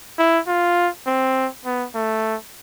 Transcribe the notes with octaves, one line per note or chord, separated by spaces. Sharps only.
E4
F4
C4
B3
A3